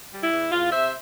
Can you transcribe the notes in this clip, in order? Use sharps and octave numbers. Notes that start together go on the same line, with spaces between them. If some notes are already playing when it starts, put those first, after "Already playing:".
G3
E4
E2
E2 F4
C3 C5 E5